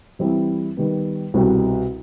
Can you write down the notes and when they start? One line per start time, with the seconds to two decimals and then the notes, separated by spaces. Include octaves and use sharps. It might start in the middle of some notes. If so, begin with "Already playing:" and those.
0.19 E3 G3 C4 E4
0.77 D#3 G3 B3
1.34 C2 B2 G3 C4 F#4